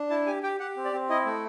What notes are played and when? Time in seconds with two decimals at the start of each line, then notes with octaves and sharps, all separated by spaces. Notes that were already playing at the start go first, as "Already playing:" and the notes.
Already playing: D4
0.10 E4 A5
0.26 G4 G#5
0.43 G4 G5
0.60 G4 F#5
0.77 C4
0.85 D5
0.93 C4
1.10 E4 D#5
1.26 A3